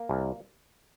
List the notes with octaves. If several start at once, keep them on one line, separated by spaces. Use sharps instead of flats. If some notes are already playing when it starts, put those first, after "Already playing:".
Already playing: A#3
C2